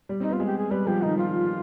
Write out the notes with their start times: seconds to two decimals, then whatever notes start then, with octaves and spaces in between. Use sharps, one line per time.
0.09 G3
0.20 C4 D#4
0.29 B3 F4
0.40 G#3
0.46 G4
0.58 G#4
0.71 G3 B4
0.87 F3 G4
1.02 D#3 D#4
1.17 F3 F4